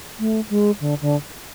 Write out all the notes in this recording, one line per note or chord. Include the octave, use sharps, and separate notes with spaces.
A3
G#3
D3
D3